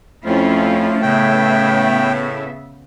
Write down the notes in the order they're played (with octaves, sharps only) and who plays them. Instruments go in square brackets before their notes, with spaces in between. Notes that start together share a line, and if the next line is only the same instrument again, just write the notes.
[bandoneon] F2 [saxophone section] F3 [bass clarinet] A3 [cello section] C#4 E4 F4
[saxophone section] A2 [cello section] C#3 B3 E5 [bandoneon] G5